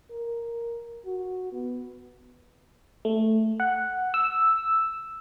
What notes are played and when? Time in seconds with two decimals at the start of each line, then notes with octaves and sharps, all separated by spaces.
0.11 A#4
1.06 F#4
1.52 B3
3.05 A3
3.60 F#5
4.14 E6